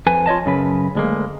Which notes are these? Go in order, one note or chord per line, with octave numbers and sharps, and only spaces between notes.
F2 B4 G#5
F4 C#5 D#5 A5
F#2 C#3 B4
D2 G#3 A#3